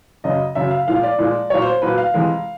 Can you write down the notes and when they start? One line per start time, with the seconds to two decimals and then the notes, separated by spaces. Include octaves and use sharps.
0.24 F#2 C#3 F#3 D#5
0.55 F#2 C#3 F#3 E5
0.71 F5
0.87 A#2 F3 G#3 F5
1.03 D5
1.18 A#2 F3 G#3
1.50 A#2 F#3 C#5
1.62 C5
1.82 A#2 F#3 B4
1.98 F5
2.14 F2 C3 E3 G#3